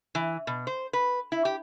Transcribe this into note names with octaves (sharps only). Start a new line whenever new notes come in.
E3
B2
C5
B4
E4
G4